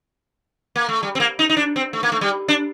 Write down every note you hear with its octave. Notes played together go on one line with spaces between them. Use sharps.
A#3
A3
G3
C4
A#3
D#4
D#4
D4
C4
A3
A#3
A3
G3
D4